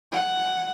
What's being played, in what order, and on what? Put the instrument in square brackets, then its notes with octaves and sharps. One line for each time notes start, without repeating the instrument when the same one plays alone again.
[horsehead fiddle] F#5